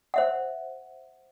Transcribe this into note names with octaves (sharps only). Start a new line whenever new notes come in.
C5 E5 F#5